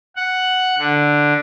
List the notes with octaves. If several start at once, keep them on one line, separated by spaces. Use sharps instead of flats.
F#5
D3